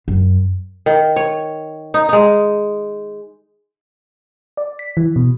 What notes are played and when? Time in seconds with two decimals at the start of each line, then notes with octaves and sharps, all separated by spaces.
0.08 F#2
0.86 D#3
1.16 C#5
1.94 D#4
2.09 G#3 D#4
4.57 D5
4.79 B6
4.97 E3
5.16 B2